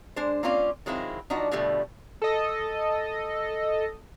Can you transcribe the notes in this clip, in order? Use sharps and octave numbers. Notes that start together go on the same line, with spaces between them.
G#3 D4 C5
A#3 C4 C#4 F4 D5 F5
D#3 F#3 G#3 C4 E4 F4
F3 D4 D#4 F#4
B2 D3 F3 G3 A3
A4 D#5